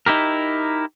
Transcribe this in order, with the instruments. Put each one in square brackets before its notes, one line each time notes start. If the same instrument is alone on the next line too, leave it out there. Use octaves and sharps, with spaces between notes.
[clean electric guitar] D#4 E4 G4 A#4